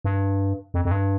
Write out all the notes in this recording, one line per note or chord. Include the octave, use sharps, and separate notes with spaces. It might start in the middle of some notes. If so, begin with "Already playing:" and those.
G2
F2
F2
G2